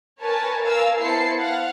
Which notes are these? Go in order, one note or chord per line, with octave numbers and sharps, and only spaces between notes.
A#4 B4 C#5 G#5 A5
A#4 F5 G#5 E6
B3 E4 C5 A5 C7 C#7
F5 F#5